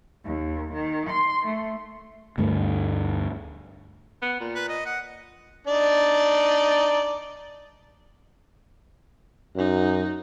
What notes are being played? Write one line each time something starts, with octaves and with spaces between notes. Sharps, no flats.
D#2
D#3
C6
A3
D2 G2 G3 A3
B3
A#2
B4
D#5
F#5
D4 D#4 D5
F#2 D#4 F#4